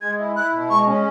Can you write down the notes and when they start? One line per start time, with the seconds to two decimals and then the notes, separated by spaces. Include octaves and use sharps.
0.01 G#3 G#6
0.19 E4
0.36 E4 F#6
0.53 B2
0.70 G#3 C#6
0.87 C#4